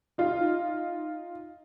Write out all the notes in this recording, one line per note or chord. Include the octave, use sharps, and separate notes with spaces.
D#4 F4